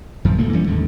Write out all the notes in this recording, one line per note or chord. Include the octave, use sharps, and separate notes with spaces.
G1 F#2 F3
D2 A#2 A3 A#3
E3 G3 C#4
D#2 G#2 D3